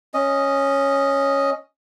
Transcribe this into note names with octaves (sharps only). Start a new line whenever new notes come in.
C#4 D#5